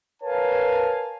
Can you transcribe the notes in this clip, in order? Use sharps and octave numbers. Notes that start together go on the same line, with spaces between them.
A#4 B4 C#5 F5 G#5 A5